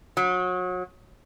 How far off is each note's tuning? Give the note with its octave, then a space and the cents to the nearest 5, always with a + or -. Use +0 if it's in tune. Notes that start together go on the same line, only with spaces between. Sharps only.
F#3 -30